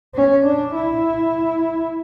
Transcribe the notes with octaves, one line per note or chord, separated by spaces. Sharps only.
C#4
D4
E4